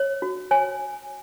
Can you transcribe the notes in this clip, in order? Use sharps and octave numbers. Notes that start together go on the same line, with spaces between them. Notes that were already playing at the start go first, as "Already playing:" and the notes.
Already playing: C#5
F#4
C#5 G#5